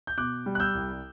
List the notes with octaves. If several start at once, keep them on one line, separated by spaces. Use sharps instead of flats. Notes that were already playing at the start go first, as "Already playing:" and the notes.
G6
B2 D6 F#6
G3
F#6
E6 G6
C2